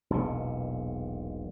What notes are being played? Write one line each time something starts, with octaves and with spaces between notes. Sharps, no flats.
E1 B1 A#2